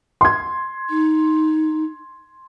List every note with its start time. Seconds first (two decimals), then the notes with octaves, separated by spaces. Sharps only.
0.21 C6 G#6
0.90 D#4